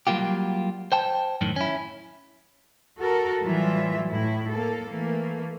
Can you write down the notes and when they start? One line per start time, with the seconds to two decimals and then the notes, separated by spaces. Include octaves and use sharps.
0.07 F#3 G3 A#3 F4 G4
0.92 C5 G5 A5
1.41 F#2 A2 D#3
1.56 C#4 E4
2.98 F#4 A4 A#4
3.41 A2 E3 F#3 G3 F4 E5
4.09 A2 E4
4.52 A#3 A4
4.89 E3 A3 A#3